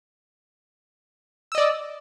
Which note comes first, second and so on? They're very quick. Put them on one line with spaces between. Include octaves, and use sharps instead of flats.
E6 D#5 D5